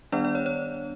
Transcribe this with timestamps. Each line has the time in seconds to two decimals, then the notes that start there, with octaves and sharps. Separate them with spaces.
0.12 D#3 G3 B3 D4 D5
0.25 D5
0.35 C#5
0.46 C#5